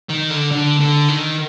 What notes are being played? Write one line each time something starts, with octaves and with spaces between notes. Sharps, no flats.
D#3
D3
D3
D3
D#3